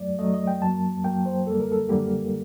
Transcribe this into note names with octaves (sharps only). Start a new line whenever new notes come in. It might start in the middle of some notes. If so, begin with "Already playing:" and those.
Already playing: F#2 F#3 A3 D5
F#2 F#3 A3 D#5
D#5
G5
F#2 F#3 A#3 A5
F#2 F#3 A#3 G5
C5
F#2 D3 G3 A#3 A4
A#4
A4
F#2 D3 G3 A#3 G4